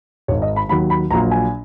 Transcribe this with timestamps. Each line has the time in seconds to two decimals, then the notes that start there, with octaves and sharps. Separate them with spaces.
0.28 G#1 G#2 D#3 C#5
0.42 D#5
0.56 B5
0.69 D#2 D#3 F#3 B5
0.90 B5
1.11 A#1 A#2 F#3 A#5
1.31 G#5